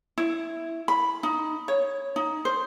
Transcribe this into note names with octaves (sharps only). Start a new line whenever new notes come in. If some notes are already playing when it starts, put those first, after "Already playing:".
E4
B5
D#4
C#5
D#4
C5